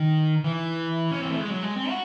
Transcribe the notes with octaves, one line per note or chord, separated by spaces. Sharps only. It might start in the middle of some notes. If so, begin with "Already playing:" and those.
Already playing: D#3
E3
C#4
C4
A3
G#3
F#3
G#3
C4
F#4